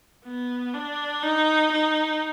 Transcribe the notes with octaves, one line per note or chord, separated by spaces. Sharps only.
B3
D4
D#4
D#4